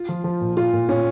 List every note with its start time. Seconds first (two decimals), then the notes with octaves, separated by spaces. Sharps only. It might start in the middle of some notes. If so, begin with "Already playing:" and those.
Already playing: F4
0.09 F3
0.24 F3
0.41 A#2
0.57 A#2 F4
0.73 A#2
0.89 A#2 C#4